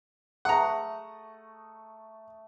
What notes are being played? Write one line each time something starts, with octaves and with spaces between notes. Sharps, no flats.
A3 D#5 F#5 A#5